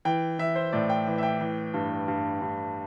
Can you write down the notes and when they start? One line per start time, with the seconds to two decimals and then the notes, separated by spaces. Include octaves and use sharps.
0.05 E3 G5
0.39 E3 E5
0.56 C5
0.73 A2 D5
0.90 G5
1.07 E3
1.18 E5
1.23 G5
1.41 E3
1.74 G2
2.08 G2
2.42 G2